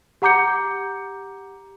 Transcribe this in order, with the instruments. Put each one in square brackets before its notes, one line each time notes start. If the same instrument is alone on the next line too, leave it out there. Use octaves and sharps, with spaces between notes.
[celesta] G4 F#5 A#5 D6 G6 C#7